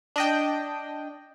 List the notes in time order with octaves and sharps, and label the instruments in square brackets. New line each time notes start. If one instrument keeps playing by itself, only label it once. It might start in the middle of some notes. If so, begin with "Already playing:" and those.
[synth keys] D4 D#5 G5